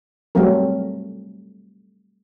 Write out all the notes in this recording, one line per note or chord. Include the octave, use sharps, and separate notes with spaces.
F#3 G3 A3 C4 A#4